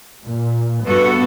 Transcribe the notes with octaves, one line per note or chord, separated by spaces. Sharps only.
A#2
G2 B3 F#4 A4